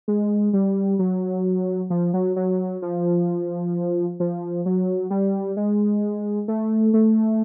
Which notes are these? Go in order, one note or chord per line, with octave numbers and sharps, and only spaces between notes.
G#3
G3
F#3
F3
F#3
F#3
F3
F3
F#3
G3
G#3
A3
A3